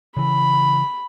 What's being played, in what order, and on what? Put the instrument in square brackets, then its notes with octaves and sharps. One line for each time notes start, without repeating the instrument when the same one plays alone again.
[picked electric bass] C#3 E3 [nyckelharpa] B5